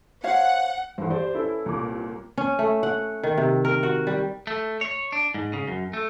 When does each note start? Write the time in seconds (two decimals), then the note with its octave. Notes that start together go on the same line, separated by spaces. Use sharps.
0.24 C5 C#5 F5 F#5
0.98 G2 E3 C5 F#5
1.10 G4 C5 D5
1.34 C#4 E4 A4 B4
1.66 C2 A#2 D6
2.38 C#4
2.59 A3
2.83 F#5
3.23 D#3
3.37 C3
3.65 A#4
3.83 F#4
4.07 G3
4.47 A3
4.81 C#5
5.12 D4
5.34 G#2
5.53 C#3
5.68 F#2
5.93 A3